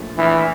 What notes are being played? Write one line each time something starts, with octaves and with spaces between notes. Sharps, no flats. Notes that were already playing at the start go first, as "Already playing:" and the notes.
Already playing: A#1 A#2 A3 D4
E3